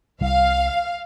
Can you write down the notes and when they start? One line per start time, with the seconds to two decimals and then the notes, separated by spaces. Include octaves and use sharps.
0.21 C2 C3 G3 F5